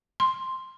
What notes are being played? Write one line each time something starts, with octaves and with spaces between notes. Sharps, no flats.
C6